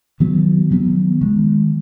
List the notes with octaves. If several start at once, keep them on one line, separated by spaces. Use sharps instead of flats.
D#3 F#3 B3
D#3 F#3 B3
D#3 G#3